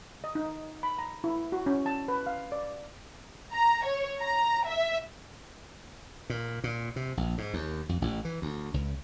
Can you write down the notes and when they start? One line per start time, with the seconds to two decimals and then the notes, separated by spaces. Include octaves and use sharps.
0.24 D#5
0.35 D#4
0.83 B5
0.99 A#5
1.24 E4
1.52 F#4
1.66 C#4
1.86 A5
2.08 B4
2.26 F5
2.52 D5
3.52 A#5
3.85 C#5
4.19 A#5
4.67 E5
6.30 A#2
6.64 A#2
6.96 C3
7.17 A#1
7.38 G#2
7.54 D#2
7.89 F2
8.02 A1
8.25 E3
8.42 D2
8.74 C#2